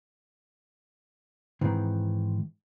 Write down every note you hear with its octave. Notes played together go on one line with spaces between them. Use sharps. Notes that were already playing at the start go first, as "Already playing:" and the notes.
G#2 D#3 E3 C4